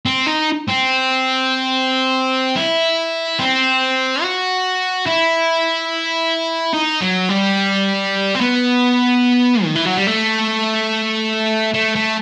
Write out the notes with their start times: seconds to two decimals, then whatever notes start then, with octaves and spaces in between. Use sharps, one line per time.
0.06 C4
0.26 D#4
0.68 C4
2.56 E4
3.39 C4
4.23 F#4
5.07 E4
6.73 D#4
7.01 F#3
7.29 G3
8.35 C4
8.41 B3
9.64 D#3
9.75 E3
9.85 F#3
9.97 G3
10.07 A3
11.74 A3
11.95 A3